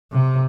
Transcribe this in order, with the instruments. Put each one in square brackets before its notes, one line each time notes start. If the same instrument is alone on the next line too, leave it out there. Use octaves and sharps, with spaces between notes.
[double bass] C3